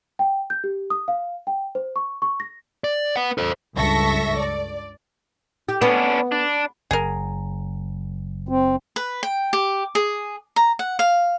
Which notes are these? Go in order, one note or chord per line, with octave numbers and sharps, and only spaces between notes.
G5
G6
G4
D#6
F5
G5
C5
C#6
C#6
A#6
D5
B4 F#5
A4 C5
C#2 G2 A4 E5 C#6 A#6
D5
G4
B3 C#4 D4
D4
F#1 G#4 A#4
C4
B4
G5
G4
G#4
A#5
F#5
F5